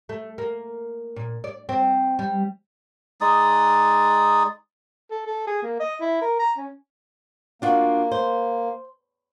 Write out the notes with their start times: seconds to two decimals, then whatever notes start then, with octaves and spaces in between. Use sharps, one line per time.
0.09 A3
0.38 A#3
1.16 A#2
1.44 D5
1.69 C4
2.19 G3
3.21 G#3 D#4 D5 D#6
5.11 A4
5.27 A4
5.47 G#4
5.63 A#3
5.80 D#5
6.01 E4
6.21 A#4
6.39 A#5
6.57 C#4
7.62 A#3 D4 F4 F#4
8.12 C5